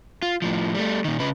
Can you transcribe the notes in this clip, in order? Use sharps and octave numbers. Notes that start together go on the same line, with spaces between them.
F4
A2 F3
G3 A3
A#2 D#3
C#3 B4